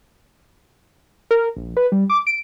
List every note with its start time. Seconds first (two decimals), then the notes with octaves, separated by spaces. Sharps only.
1.31 A#4
1.57 A#1
1.77 B4
1.92 G3
2.10 D6
2.27 D7